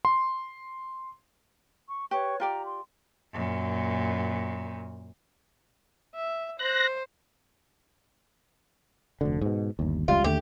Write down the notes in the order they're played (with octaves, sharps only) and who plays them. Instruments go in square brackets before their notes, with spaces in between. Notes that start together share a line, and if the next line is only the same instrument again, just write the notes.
[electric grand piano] C6
[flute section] C#6
[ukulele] G4 [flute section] B4 C#5 C#6
[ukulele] F4 G4 D5 [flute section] A#5
[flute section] C6
[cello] F#2 A#2
[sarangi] E5
[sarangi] C5 [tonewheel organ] F#6 A#6
[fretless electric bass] F1 D2 D3
G#2 B2
G1 D#2
[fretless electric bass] F1 C#2 G3 [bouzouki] F4
[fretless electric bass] D#2 D3 A3 [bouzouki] G4